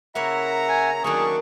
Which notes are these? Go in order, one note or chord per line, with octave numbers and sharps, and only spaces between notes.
C#3 A#3 C#4 E4 C#5 E5 F#5 A#5
G#5
D#3 F#3 A3 A#3 C#4 D4 G#4 C#6